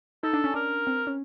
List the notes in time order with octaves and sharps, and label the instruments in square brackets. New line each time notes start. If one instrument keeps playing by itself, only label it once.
[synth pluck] D#4 [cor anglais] A4
[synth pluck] D4
C#4
[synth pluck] D4 [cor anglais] A#4
[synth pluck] C4
C#4